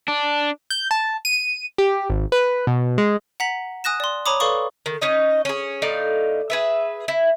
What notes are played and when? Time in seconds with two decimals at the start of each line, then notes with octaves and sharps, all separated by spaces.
0.08 D4
0.70 G6
0.91 A5
1.25 D#7
1.78 G4
2.10 G#1
2.32 B4
2.67 B2
2.98 G#3
3.40 F#5 A#5 B6 F#7
3.84 G#5 D#6 F#6 A#6 E7
4.00 D5 C6
4.26 C#5 G#5 A#5 B5 D6 D#6
4.40 A4 B4 D5 F5 C#6 D#6
4.86 D#3
5.01 C#4 D#4 D#5
5.45 C#4 G#4
5.82 A2 D#4 D5 F5
6.50 G#4 B4 E5
7.08 E4